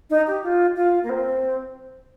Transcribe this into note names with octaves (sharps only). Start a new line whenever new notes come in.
D#4
G4
F4
F4
A#3
C4